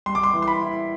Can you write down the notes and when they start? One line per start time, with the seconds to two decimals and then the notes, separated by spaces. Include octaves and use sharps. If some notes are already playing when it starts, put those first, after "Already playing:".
0.06 G3 C6
0.15 D6
0.23 C6
0.34 E3
0.42 C6
0.48 B5
0.62 E4